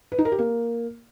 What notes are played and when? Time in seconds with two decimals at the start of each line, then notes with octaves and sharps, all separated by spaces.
0.12 B4
0.18 D#4
0.25 A#4
0.32 G4
0.39 A#3